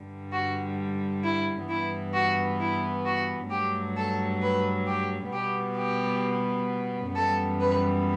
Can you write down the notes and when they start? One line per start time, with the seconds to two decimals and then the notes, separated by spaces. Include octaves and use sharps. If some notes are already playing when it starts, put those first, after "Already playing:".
Already playing: G2 D3 G3
0.32 F#4
1.24 E4
1.68 G2 E3 B3 E4
2.14 F#4
2.60 E4
3.06 F#4
3.50 G2 F#3 A3 G4
3.96 A4
4.42 B4
4.88 G4
5.32 B2 G3 B3 G4
5.78 G4
7.15 F#2 E3 G3 B3 A4
7.60 B4